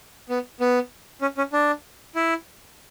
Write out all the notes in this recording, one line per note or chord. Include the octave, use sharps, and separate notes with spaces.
B3
B3
C#4
C#4
D4
E4